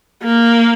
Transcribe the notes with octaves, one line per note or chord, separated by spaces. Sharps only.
A#3